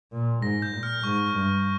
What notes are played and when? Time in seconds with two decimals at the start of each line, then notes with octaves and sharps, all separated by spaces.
0.12 A#2
0.42 G#2 A#6
0.62 G6
0.72 A#2
0.83 F6
1.03 G#2 C#6
1.34 G2